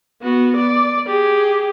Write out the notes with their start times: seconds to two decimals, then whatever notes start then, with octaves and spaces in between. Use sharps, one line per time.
0.22 B3 F#4
0.57 D5
1.07 G4 G#4